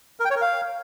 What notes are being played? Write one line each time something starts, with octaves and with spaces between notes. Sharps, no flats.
A#4
G5
C#5
A#4
F5